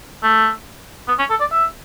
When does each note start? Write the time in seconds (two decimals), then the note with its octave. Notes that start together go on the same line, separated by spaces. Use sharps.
0.23 A3
1.08 B3
1.19 C#4
1.30 A4
1.40 D5
1.51 E5